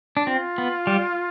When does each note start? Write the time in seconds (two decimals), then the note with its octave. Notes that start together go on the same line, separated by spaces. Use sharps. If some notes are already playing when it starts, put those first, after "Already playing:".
0.17 D4
0.27 C4 F4
0.58 B3
0.87 G3